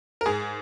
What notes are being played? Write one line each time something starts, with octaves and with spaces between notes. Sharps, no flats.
A#4
G#2 G#4